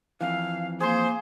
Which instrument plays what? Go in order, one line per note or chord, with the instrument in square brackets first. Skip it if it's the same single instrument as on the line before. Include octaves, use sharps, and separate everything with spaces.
[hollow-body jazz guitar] F2 E3 [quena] F5
[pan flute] A#3 [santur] G#4 C6 [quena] C5